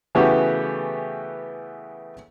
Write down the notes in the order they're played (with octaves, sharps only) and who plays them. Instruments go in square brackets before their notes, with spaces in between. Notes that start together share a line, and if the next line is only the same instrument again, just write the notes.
[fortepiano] C#3 E3 A3 B3 F#4 G4